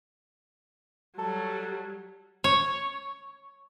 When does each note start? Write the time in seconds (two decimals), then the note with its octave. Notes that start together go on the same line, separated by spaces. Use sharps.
1.18 F#3 G3 A4
2.44 C#5